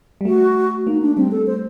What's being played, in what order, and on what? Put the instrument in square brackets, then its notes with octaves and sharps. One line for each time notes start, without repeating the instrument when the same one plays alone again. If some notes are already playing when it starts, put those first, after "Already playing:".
[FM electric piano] G3
[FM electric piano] A3 [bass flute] F#4
[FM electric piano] A#3 [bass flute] D#4
[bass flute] D4
[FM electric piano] G3 [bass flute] C4
[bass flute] A4
C5